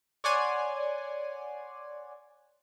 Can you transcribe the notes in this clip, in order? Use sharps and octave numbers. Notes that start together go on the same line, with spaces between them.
C#5 D5 F#5 G#5 C6